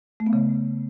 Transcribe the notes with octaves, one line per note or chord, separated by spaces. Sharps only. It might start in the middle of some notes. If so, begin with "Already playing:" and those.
A3
B3
C#3